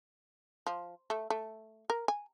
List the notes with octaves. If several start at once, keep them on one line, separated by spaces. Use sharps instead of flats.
F3
A3
A3
A#4
G#5